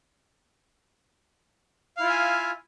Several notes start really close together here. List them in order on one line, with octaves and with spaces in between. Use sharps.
F5 E4 F4 E5 G#5